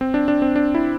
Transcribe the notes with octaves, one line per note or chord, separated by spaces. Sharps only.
C4
D4
D4
C4
D4
E4